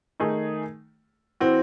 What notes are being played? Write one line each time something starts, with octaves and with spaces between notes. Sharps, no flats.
D#3 A3 D#4 G#4
E3 C4 F#4